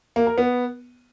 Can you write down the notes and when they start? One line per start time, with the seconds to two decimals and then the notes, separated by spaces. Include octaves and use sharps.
0.16 A#3
0.27 A#4
0.38 B3